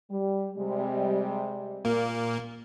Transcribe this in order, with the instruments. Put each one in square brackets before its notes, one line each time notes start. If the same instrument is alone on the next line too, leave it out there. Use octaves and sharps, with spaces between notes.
[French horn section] G3
C3 G3 G#3
[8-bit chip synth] A#2 A#3